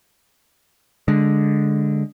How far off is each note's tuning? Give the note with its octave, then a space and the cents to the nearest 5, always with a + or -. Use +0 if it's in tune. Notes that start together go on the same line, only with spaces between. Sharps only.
D3 -5 G#3 +0